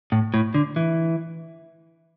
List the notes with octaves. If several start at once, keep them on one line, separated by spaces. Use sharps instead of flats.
A2
A2
D3
E3